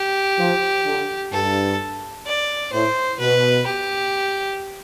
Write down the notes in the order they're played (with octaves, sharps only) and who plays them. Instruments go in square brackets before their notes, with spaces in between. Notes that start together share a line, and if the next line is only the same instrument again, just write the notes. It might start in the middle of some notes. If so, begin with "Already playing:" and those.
Already playing: [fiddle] G4
[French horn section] F3
D3
[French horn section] G2 [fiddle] A4
[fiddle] D5
[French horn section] A2 [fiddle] C5
[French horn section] B2 [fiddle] B4
[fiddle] G4